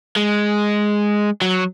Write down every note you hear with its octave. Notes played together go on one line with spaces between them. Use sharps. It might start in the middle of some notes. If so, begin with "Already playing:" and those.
G#3
F#3